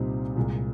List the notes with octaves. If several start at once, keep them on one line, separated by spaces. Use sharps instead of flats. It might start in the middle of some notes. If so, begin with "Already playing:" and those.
Already playing: C2 A#2 G3 C4 D#4
C2 A#2 G#3